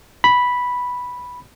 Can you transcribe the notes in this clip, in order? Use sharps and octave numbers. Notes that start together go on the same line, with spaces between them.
B5